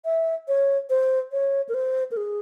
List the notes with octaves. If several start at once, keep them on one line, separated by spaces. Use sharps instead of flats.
E5
C#5
C5
C#5
A#4
C5
A#4
G#4